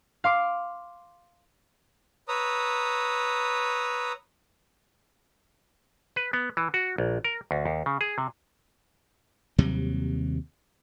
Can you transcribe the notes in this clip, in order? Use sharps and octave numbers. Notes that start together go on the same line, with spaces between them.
F5 C6 D6
B4 C#5 A#5 D#6 E6
B4
B3
E3
F#4
A#1
A#4
D2
D#2
C#3
G#4
C3
D#2 C3 F#3 G3